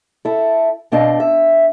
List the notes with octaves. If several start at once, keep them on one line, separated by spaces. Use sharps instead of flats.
E4 A4
B2 C4 D4 D#5 F5
E5